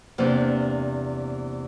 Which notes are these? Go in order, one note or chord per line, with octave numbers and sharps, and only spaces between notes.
E2 C3 A#3 D4 G6